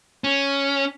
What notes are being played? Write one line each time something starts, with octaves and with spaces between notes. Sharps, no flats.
C#4